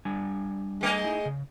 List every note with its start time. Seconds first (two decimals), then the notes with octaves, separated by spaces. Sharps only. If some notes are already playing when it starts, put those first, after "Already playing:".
0.05 G3 D4 G#5
0.81 G#3 A3 D#5
1.04 D#4 E4
1.25 C#3